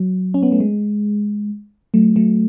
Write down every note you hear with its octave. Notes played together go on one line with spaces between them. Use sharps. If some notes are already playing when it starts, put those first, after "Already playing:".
Already playing: F#3
C#4
B3
A3
G#3
F#3 A3
F#3 A3